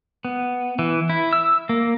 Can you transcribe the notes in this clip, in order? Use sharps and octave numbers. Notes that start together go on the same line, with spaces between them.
B3
E3
E4
E6
A#3